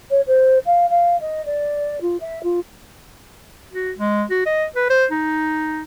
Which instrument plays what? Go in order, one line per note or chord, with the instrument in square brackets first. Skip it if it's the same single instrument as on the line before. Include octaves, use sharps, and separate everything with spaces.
[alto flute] C#5
C5
F5
F5
D#5
D5
F4
E5
F4
[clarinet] F#4
G#3
F#4
D#5
B4
C5
D#4